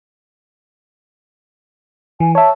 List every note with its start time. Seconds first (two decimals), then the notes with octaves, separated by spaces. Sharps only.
2.20 E3 G#5
2.35 C#5 E5 A5